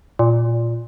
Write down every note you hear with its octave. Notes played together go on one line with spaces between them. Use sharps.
A#2